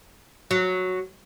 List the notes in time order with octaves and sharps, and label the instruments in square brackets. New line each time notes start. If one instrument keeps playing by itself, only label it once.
[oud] F#3